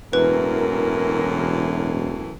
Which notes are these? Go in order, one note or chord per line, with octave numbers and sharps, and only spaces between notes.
E1 F#2 A2 E3 A#4 B4